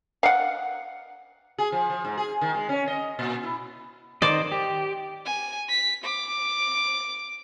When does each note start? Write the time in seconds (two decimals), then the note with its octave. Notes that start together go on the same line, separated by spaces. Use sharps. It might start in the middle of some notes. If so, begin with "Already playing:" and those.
0.23 F5 F#5
1.58 G#4
1.72 F3
1.90 F3
2.05 G#2
2.18 G#4
2.41 D#3
2.54 G#3
2.69 C#4
2.88 D#5
3.19 A#2
3.43 E4
4.22 D#3 C5 D5 D#5
4.52 G4
5.25 G#5
5.69 B6
6.04 D6